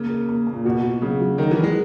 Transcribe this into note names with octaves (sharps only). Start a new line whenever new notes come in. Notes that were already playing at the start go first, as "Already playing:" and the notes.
Already playing: C#3 A#3
A#4
A#3
A#3
A#2
B2 F#4
F#4
C#3 F#3
F#3
D#3 A#4
E3
A#4
G#3